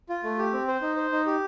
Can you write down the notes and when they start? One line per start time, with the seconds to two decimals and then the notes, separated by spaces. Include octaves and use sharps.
0.09 F4
0.23 A3
0.38 G4
0.53 C4
0.68 C5
0.81 D#4
0.96 C5
1.12 D#4
1.26 G4